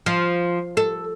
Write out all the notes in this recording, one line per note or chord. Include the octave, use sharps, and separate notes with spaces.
F3
A4